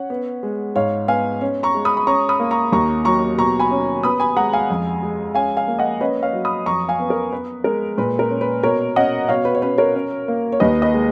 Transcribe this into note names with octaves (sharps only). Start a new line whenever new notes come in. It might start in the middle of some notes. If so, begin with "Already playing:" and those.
Already playing: C#4 F#5
B3
G#3
G#2 C#5 F5
B3 F5 G#5
C#4
A#5 C#6
G#3
B5 D#6
B5
C#4 A#5 C#6
B5 D#6
A#3
A#5 C#6
D#2 A#5 C#6
F#3 A#5 C#6
B2 A#5 C#6
G#5 B5
C#4
B3 B5 D#6
G#5 B5
G#3 F#5 A#5
F5 G#5
F2
G#3
C#4 F5 G#5
F5 G#5
A#3
D#5 F#5
C#4 B4 D#5
C#5 F5
F#3
B5 D#6
F2 A#5 C#6
F5 G#5
B3
A#4
B3 B4
G#3 A#4
A#2 B4
A#4
C#4
B4
B2 A#4 C#5
C#4 D#5 F#5
B2 C#5 F5
B4
C#5
C#4 B4
A#4 C#5
C#4
A#3
C#5
D#2 B4 D#5
B4 D#5
G#3